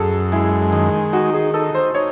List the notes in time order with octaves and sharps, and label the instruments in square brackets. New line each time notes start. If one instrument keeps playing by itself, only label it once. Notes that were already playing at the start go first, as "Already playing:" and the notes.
Already playing: [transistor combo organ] F#2 [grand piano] G#4 A4
[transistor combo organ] G#3 [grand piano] E4
[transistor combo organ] D#3
[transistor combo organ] D#4 [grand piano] F#4
[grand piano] G#4
[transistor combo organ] D#4 [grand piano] A4
[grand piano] C5
[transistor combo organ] D#4 [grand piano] C#5